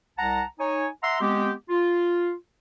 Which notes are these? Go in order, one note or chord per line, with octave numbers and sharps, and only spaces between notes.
C2 F#5 A5 A#5
D#4 C#5 G#5
E5 F#5 A#5 C6
G#3 B3 C4 G4
F4